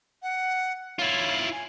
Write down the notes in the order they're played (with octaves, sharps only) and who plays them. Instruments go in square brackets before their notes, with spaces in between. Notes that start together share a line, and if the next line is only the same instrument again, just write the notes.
[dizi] F#5
[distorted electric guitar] E4 F4 [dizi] C#5
[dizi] G#5